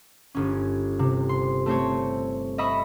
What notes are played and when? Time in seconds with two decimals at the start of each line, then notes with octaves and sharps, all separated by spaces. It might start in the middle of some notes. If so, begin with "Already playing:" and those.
0.35 G1 C#4
0.99 C3
1.29 C6
1.66 A3 C4 C5 C#5
2.58 D#5 E5 B5 C#6